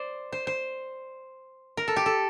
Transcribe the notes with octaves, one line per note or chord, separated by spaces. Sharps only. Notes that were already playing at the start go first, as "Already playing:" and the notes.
Already playing: C5 D5
C5
C5
A#4
A4
G4
A4